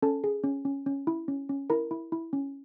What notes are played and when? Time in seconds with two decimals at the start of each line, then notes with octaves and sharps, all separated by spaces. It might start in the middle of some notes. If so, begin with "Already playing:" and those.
0.02 C#4 A4 A5
0.24 G#4
0.44 C#4
0.65 C#4
0.86 C#4
1.07 E4
1.28 C#4
1.49 C#4
1.70 E4 A#4 A#5
1.91 E4
2.12 E4
2.33 C#4